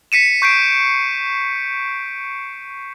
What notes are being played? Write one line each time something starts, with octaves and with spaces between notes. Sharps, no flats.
B6 C#7 D#7 E7
C#6 G6 C7 D7